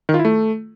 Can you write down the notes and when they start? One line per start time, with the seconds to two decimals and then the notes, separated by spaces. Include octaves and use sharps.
0.09 D#3
0.14 F4
0.19 E4
0.25 A3